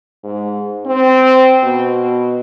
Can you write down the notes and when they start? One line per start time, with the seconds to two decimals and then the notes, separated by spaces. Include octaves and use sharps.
0.24 G#2
0.86 C4
1.63 B2